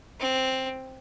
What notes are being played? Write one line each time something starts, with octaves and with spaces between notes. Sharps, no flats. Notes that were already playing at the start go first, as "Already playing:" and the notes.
C4